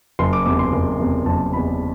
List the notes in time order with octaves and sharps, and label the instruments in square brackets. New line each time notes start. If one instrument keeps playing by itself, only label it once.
[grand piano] F#1 C6
D6
E2 C3 D6
C6
F#1
E2 C3
F#1 A5
E2 C3 B5